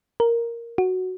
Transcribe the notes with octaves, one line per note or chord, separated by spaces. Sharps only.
A#4
F#4